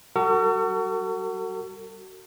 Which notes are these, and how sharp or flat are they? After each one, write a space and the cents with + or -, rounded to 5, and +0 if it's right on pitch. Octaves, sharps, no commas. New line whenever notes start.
G3 -25 F#4 +25 A4 +45